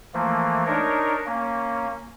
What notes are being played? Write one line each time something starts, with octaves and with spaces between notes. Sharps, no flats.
E3 F3 A3 A#3
D4 D#4 A#4 C#5
A#3 C#4